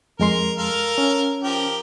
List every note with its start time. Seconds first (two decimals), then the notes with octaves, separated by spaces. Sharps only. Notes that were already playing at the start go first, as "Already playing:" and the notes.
0.19 F2 G#3 A#4 C6
0.58 A4 A#4 F5
0.98 C#4
1.44 F3 G4 A#4